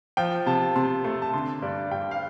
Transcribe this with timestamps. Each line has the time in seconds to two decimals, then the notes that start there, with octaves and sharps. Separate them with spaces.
0.17 F3 G5
0.46 C3 A5
0.76 C3 C6
1.04 A3 C6
1.22 A5
1.33 D3 C6
1.62 G2 D5
1.91 G2 G5
2.11 F5